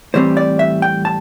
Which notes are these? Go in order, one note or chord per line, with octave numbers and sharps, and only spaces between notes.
A2 E3 G3 C4 C5
D5
E5
G5
A5